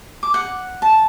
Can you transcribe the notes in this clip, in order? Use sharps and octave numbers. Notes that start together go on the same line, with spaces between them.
D6
F#5
A5